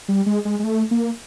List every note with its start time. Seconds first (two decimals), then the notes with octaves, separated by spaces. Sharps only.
0.08 G3
0.26 G#3
0.45 G#3
0.59 G#3
0.64 A3
0.91 A#3